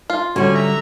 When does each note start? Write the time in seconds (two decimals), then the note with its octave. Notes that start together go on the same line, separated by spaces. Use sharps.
0.10 F4
0.36 D3 F#3 G3 C#4 C#5 G#5
0.54 E5 A#5